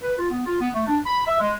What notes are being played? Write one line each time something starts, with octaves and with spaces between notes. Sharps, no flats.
B4
F4
B3
F4
B3
A3
D4
B5
E5
G#3